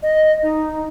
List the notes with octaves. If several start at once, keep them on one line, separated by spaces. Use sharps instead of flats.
D#5
D#4